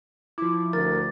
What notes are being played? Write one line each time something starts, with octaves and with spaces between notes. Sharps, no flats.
F3 E4 D6
D2 A#4 A6